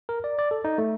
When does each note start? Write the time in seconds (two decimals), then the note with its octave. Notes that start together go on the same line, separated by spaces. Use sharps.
0.09 A#4
0.24 D5
0.39 D5
0.51 A4
0.65 D#4
0.78 A3